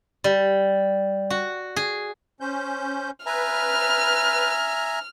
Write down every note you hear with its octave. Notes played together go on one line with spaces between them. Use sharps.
G3
F#4
G#4
C#4 C5 G6
B4 E5 G#5 A#5 F6